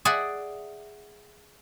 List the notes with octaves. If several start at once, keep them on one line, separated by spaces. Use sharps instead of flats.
G#4 D5 E5 F#5